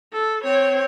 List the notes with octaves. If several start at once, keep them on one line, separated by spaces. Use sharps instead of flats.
A4
C4 C#5